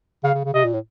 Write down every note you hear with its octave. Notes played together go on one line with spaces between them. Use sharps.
C#3 F5
C#3
C#3
C3 D#5
A#2
A2